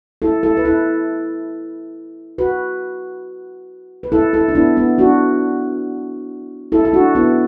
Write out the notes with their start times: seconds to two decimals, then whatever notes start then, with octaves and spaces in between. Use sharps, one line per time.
0.22 E4 A4
0.43 E4 A4
0.57 B4
0.65 E4 A4
2.38 F#4 B4
4.03 B4
4.12 E4 A4
4.33 E4 A4
4.48 D4
4.55 B3 E4
4.77 B3 E4
4.98 D4 F#4
6.72 E4 A4
6.85 A4
6.93 D4 F#4
7.15 B3 E4